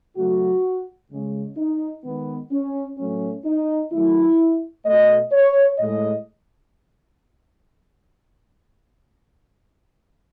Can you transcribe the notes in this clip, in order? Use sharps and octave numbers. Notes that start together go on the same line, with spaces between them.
C#3 F#3 A3 F#4
C#3 G#3
D#4
D#3 G#3 B3
C#4
A2 F#3 A3 C#4
D#4
D#3 F#3 A3 E4
B2 A3 D#5
C#5
A2 G#3 D#5